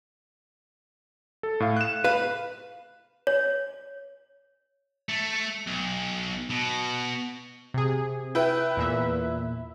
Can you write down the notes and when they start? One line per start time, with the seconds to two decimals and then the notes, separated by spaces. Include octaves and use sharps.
1.43 A4
1.60 A2 F5
1.76 F#6 E7
2.04 B4 F5
3.27 C#5
5.09 A3
5.67 B1
6.51 B2
7.74 C3 G#4
8.35 E4 B4 G5
8.77 E2 A#2 E5